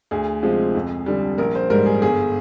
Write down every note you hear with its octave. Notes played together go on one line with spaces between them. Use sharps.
D2 G#4
C3 F3 G#3
F2
D3 G3
A#1 A#4
C5
G#2 G3 A#4
G#4
G1 G#4